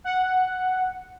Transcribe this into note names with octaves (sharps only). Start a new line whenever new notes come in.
F#5